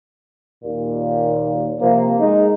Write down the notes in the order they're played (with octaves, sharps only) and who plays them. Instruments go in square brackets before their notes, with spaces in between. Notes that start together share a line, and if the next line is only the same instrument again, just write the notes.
[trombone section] D#2 A#2
[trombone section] C3 F3 [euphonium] A#3
[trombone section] G#3 [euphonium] D#4